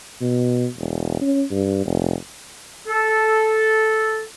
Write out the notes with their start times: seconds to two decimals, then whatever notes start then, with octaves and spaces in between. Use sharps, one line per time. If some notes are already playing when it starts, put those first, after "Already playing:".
0.21 B2
0.78 E1
1.21 C#4
1.51 G2
1.86 F1
2.88 A4